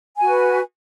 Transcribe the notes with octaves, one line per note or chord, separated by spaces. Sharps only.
F#4 B4 G#5